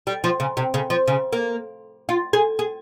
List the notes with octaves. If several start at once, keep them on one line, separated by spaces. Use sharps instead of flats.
G3
F3
C#3
C3
C#3
F3
C#3
A#3
F4
G#4
G#4